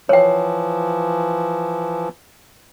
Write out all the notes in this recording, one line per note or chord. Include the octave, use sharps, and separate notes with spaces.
E3 F3 C#5 G5